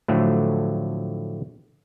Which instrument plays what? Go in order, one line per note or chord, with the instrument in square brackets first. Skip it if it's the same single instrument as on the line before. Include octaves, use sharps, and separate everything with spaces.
[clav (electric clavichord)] A2 D3 F3 F#3 A3